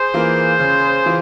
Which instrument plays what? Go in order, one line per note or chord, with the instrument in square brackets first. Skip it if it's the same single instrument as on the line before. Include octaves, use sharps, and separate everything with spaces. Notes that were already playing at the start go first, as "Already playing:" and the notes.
Already playing: [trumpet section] G#4 C5
[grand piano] E3 A#3 F4
C#3
E3 F4